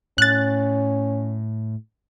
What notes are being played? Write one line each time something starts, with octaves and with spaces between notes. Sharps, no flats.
A2 C#4 F#6 A6